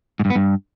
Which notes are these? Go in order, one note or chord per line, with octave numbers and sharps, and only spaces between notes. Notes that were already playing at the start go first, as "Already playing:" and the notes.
G#2
G2
B3
G2